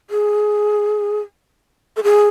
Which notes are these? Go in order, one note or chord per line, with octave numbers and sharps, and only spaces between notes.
G#4
A4
G#4